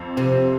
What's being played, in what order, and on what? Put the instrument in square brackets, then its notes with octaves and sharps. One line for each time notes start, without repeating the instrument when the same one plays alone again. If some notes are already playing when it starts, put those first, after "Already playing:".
Already playing: [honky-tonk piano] F2 C4
[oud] C3 [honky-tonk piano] C4